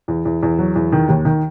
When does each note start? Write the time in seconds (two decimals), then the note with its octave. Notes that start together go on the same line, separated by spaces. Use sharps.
0.08 E2
0.25 E2
0.43 E2
0.59 F#3
0.76 E2
0.92 D#3
1.09 D#2
1.25 D#3